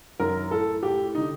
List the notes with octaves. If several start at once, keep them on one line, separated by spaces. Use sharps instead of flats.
F#2 D#3 A#4
A2 A4
A2 G4
D3 D#4